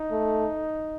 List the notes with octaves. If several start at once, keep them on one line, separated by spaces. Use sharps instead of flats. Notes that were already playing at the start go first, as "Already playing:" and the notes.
Already playing: D#4
A3